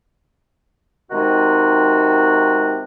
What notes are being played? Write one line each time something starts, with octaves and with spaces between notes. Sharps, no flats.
C3 D#3 G#3 D#4 F#4